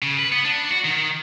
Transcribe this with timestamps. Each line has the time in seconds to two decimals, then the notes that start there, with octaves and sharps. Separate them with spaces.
0.02 C#3
0.19 B4
0.32 B3
0.45 D4
0.70 F#4
0.85 D#3